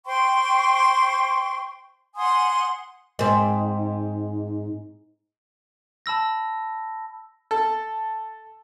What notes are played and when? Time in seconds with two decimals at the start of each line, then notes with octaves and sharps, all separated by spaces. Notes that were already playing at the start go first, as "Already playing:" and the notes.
0.06 C5 G5 C6 C#6
2.16 F#5 G#5 C6 D#6
3.19 G#2 C4
6.06 A5 B5 E6 A#6
7.51 A4